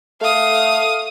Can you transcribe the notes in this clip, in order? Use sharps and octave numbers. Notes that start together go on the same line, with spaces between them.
A3 F5 D#6